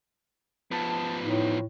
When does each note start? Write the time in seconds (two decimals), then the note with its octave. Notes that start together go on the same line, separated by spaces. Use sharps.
0.71 F3 B3 A5
1.22 A2 D#4